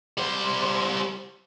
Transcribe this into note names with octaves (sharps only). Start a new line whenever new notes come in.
G3 C5